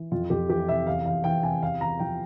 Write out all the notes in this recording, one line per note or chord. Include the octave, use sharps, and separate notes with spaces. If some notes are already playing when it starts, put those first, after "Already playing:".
Already playing: E3
F2 F4
F2 G4
E3 G4
C3 E5
E2 F5
E2 F5
E3 G5
C3 G#5
E2 F5
E2 A#5
F3 G5